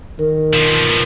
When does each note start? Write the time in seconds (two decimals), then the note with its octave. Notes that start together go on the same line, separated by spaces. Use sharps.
0.19 D#3 A#4
0.53 B2 F3